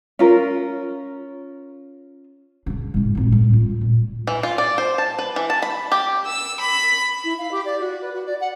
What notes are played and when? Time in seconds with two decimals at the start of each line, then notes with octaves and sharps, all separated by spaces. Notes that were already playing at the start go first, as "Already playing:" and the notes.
0.19 C#4 F4 A#4
2.66 C#3 D4
2.94 G#2 E4
3.15 G#1 A#2
3.32 A2
3.50 D4 F4
3.81 A#2
4.27 E3
4.43 F4
4.58 D5
4.78 C5
4.98 A5
5.19 B4
5.36 E3
5.50 A5
5.62 B5
5.92 G4
6.26 E6
6.60 B5
7.24 E4
7.38 F5
7.51 G4
7.65 D5
7.80 F#4
8.01 B4
8.13 F#4
8.25 D5
8.40 F#5